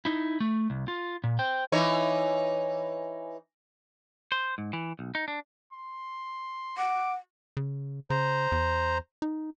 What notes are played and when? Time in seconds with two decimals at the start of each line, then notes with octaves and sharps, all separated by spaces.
0.05 D#4 E4
0.40 A3
0.70 C2
0.88 F4
1.24 A#2
1.39 C5 G5
1.72 E3 D#4 C#5
4.32 C5
4.58 G#2
4.73 E3
4.99 B1
5.15 D#4
5.28 D4
5.73 C6
6.78 F#5 D6
7.57 C#3
8.10 C#3 C5 A#5
8.52 E2
9.22 D#4